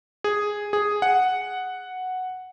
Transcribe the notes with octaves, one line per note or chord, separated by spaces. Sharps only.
G#4
G#4
F#5